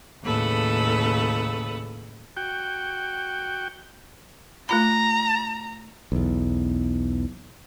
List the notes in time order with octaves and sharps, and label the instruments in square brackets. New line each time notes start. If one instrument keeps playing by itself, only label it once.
[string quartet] D#2 A2 C#3 A4 B4 F#5
[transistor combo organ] F#4 G5
[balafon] A3 F4 B5 [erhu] A#5
[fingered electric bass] B1 E2